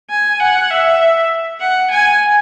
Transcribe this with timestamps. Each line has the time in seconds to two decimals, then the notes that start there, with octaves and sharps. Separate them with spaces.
0.10 G#5
0.40 F#5
0.71 E5
1.61 F#5
1.91 G#5